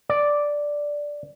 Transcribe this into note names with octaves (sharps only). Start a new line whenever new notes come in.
D5